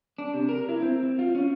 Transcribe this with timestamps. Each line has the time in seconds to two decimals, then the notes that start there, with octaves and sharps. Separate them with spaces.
0.18 D4
0.34 C3
0.49 A#4
0.69 E4
0.82 C4
1.19 F4
1.35 C#4